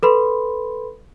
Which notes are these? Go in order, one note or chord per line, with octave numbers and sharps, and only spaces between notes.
A4 B4 B5 C6